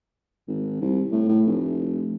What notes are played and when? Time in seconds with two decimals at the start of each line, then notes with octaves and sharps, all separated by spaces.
0.48 G#1
0.81 C2
1.12 A2
1.29 A2
1.46 F1